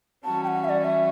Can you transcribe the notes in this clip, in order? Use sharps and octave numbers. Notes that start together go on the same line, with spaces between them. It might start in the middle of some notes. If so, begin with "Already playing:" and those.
E3 G3 C#4 F#4 A5
G5
F#5
E5
D5
E5